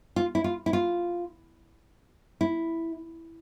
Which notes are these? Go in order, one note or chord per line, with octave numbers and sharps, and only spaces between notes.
F4
E4
F4
E4
F4
E4